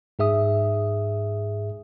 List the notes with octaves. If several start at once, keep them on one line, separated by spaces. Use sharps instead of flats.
G#2 G#4 E5 D#6